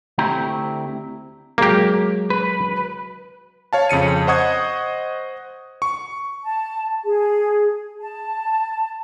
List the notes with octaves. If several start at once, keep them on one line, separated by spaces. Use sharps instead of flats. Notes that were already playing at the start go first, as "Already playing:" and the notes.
D2 A3 C4 E4 G4 A#5
F#3 G#3 A#3 G4
B4
C#5 F5 A5
F2 C#3 C#7 D#7
C5 D#5 F#5 C#6 D#6 G#6
C#6
A5
G#4
A5